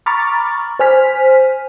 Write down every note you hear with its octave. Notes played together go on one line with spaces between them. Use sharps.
A#5 B5 C#6 D6 F6 A6
C5 G#5 F6 B6